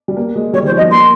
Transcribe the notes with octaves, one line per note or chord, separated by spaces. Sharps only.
G3
A#3
G#3
G3 C#5
D#3 C5
F3
D#5
G3
A#3 C6